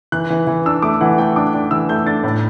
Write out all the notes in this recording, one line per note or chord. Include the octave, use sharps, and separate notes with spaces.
E3 F#6
E3
E3
D4 E6
A3 D6
E3 F#5
A3 G5
D4 D6
D4
E3 E6
A3 G6
D4 A6
A2